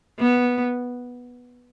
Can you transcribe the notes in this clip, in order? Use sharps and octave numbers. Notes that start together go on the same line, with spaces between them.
B3